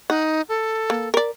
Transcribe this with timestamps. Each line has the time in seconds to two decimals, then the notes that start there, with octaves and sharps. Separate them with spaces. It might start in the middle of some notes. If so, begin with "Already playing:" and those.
0.10 D#4 F#5
0.49 A4
0.90 A#3
1.14 A#4 D5